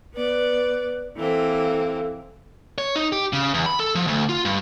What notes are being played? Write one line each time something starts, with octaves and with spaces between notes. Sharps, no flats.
B3 B4 D5
E3 A#3 C4 A4
C#5
D#4
G4
C#3
E2
B5
A4
F3
D2
F4
G2